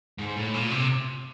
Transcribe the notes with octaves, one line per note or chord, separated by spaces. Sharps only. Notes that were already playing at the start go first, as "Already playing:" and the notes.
G#2
A2
A#2
C3